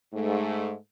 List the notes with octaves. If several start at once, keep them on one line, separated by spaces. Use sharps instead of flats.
G#2 A3